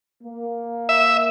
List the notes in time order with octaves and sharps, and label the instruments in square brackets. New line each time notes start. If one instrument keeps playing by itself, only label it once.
[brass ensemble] A#3
[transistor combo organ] E5